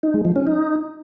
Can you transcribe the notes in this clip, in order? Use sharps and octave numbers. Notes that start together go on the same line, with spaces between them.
D#4
G#3
F3
C#4
D#4